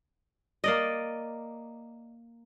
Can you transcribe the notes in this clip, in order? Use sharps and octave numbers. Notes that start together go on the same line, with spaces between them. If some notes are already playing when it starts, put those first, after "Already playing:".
A#3 D5 D#5